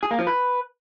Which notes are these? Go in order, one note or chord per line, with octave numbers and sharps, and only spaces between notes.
G#4
A#3
F3
B4